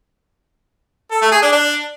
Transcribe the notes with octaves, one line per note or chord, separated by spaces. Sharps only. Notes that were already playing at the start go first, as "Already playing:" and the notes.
A4
A3
G#4
D4
D4